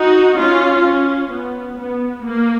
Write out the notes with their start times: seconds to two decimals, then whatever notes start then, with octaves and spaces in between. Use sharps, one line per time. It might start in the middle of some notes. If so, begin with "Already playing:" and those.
Already playing: D#4 F#4
0.40 C#4 F4
0.86 C#4
1.31 B3
1.78 B3
2.24 A#3